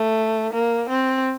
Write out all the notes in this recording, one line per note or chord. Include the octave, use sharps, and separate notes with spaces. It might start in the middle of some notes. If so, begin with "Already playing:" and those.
Already playing: A3
A#3
C4